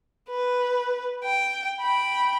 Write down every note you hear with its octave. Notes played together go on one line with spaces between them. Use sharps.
B4
G5
G5 B5